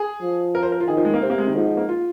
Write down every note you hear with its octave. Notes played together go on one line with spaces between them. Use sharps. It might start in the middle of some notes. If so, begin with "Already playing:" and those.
Already playing: G#4
F3
A#4
C5
A#4
F4
D#3 G#4
F3
G#3
A#3
C3 C4
A#3
G#3
D#3
G#2 F3
F3
A#3
F4